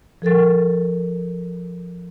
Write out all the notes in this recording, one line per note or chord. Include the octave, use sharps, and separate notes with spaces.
F3 A4 A#4 A6